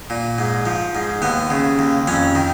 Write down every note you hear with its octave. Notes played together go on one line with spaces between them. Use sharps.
A#2
G#2
F3
G#2
D#2 B3
C#3
D#2
F2 C#4
D#3